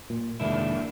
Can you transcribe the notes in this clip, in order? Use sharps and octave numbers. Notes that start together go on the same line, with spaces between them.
A#2
F1 G#2 D#3 A#3 D4 E4